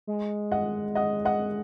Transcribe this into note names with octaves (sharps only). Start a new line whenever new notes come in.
G#3
D#5 F#5
D#5 F#5
D#5 F#5